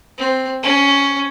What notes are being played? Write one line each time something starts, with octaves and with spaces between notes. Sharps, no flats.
C4
C#4